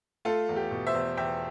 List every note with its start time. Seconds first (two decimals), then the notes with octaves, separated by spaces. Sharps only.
0.25 A3 F4 A4
0.49 E2
0.56 G4
0.71 B2
0.87 C5 E5
0.94 E2
1.17 E2 E5 G5